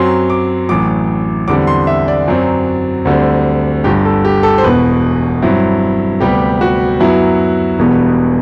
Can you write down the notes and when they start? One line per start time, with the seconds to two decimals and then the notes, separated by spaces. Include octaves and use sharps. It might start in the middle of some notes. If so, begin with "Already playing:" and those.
Already playing: F#2 F#3 C4 C6
0.30 D6
0.69 A1 A2 F#3 D6
1.48 E2 D3 G3 C4 D6
1.67 C6
1.87 E5
2.08 D5
2.28 F#2 F#3 C4
3.05 D2 D3 G3 C4
3.84 G1 G2 D3 G4
4.05 A4
4.25 G4
4.43 A4
4.58 C5
4.63 E1 E2 B2 B4
5.42 G2 F#3 C4 E4
6.20 D2 C3 G3 B3 G4
6.61 F#4
7.00 F#2 F#3 B3 E4
7.79 E1 E2 B2 G3 B3